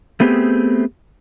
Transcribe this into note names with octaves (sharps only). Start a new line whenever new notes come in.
A3 B3 C4 G4 G#4